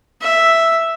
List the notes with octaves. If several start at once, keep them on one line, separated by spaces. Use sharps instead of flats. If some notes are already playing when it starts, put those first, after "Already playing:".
E5